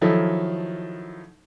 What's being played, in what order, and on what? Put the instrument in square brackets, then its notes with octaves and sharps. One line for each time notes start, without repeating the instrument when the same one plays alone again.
[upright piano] D#3 F3 F#3 D#4 E4 A4